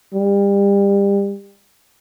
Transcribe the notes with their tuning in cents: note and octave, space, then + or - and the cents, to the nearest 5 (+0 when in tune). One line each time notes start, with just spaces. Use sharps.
G3 +30